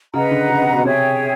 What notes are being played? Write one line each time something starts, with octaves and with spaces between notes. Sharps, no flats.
C#3 B4 D#5 F#5 A#5
D3
C#3
C3
B2
C3 G#4 C#5 E5 G5